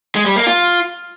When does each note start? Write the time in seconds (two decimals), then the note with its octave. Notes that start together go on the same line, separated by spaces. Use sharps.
0.15 G#3
0.26 G3
0.36 A#3
0.47 F4